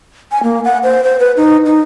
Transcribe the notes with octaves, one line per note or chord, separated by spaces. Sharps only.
G#5
A#3
F#5
C5
C5
B4
D#4
D#4